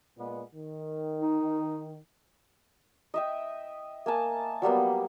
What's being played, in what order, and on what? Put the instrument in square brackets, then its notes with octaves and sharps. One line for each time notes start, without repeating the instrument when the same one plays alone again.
[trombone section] A#2 G#3 B3
D#3
[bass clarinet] D#4
[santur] D#5 E5 G5
A#3 G#5 A5
F#3 G3 A#3 B3